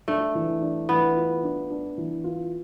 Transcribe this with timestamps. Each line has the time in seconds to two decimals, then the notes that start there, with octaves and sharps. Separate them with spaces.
0.08 A3 D4
0.35 E3
0.61 D4
0.88 E3 B3
1.17 F4
1.43 D4
1.70 D4
1.98 E3
2.24 F4